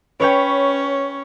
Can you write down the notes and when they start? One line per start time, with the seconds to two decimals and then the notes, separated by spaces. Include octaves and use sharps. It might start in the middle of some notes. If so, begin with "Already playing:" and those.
0.20 C#4 B4 C#5 G5